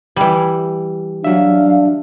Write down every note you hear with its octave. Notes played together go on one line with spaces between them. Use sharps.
E3 G3
F#3 D4 E5 F5